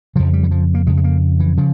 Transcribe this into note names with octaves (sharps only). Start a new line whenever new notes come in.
F2 C#3 F3
G3
E3
F3
A#3
F2 C#3 G#3
G#3
A#3
E3
C#3 F3